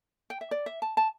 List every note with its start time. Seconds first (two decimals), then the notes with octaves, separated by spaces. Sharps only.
0.30 G5
0.41 E5
0.51 D5
0.66 E5
0.82 A5
0.97 A5